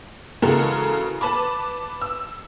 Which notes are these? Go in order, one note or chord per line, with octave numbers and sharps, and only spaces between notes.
C#3 E3 G#3 F#4 A4 A#4
B4 A5 B5 D6
E6